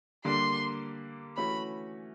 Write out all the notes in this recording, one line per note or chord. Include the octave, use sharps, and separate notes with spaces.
D3 G3 A#3 D4 C6
E3 A3 C#4 F#4 B5